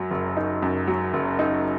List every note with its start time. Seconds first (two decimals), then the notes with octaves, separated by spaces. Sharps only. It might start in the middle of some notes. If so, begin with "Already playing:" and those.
Already playing: F#2 F#3
0.11 F#1
0.37 D#4
0.62 F#2
0.87 F#3
1.13 F#1
1.39 D#4